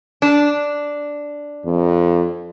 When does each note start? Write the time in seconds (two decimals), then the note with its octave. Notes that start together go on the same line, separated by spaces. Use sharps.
0.22 D4
1.66 F2